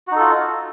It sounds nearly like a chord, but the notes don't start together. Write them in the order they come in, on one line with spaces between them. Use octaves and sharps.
F#4 D#4 A4 F4